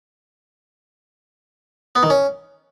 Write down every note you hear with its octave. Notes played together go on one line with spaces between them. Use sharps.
B3
D#3
C#4